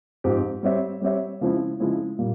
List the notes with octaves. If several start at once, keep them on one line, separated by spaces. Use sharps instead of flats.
G#2 F3 C4 G4
G3 C4 G4 C#5 E5
G3 C4 G4 C#5 E5
C#3 F3 G#3 C4 E4
C#3 F3 G#3 C4 E4
A#2 G3 A#3